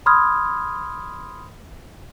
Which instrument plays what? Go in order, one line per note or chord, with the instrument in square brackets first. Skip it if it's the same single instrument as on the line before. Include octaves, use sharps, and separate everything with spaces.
[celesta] B5 C6 D#6 F6 G#6